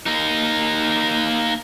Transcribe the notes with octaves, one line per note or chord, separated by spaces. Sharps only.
A#3 D#4